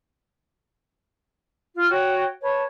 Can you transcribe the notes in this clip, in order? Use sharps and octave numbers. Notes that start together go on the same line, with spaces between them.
F4
F#4 C#5 G5
B4 C#5 A5